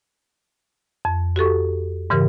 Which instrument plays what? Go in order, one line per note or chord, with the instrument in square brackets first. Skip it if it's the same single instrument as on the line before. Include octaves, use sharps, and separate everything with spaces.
[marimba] F2
F#4 G4 A4 C#6
G#2 C#3 E3 G4 A#4